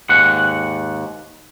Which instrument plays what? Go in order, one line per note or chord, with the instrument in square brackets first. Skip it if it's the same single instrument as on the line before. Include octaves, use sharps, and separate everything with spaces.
[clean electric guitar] D#2 G#2 F#5